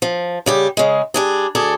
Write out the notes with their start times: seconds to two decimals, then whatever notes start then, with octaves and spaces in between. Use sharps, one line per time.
0.02 F3
0.46 C#3 G3 G4
0.77 C#3 G#3
1.14 G3 D4 G#4
1.55 D2 G#4 A4 D5